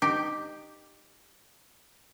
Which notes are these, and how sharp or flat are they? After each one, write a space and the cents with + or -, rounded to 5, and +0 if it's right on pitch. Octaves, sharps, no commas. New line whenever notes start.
D#4 -25 G4 +0